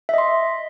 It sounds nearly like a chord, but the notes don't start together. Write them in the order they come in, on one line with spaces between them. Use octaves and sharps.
E5 D#5 C6